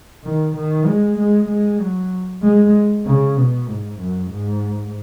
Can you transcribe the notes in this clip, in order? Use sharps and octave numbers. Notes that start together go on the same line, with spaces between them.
D#3
D#3
G#3
G#3
G#3
F#3
G#3
C#3
B2
G#2
F#2
G#2